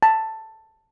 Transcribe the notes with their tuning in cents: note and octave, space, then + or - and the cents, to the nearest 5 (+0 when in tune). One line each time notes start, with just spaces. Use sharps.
A5 +10